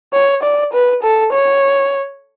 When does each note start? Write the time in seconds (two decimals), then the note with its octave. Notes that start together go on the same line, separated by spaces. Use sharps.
0.13 C#5
0.43 D5
0.73 B4
1.03 A4
1.33 C#5